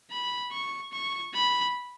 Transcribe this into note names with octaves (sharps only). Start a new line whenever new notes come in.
B5
C#6
C#6
B5